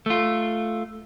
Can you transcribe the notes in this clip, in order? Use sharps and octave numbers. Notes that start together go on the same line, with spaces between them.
A3 F4